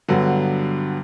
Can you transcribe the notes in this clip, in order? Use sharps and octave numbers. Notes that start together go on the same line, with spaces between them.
G2 D3 F#3 B3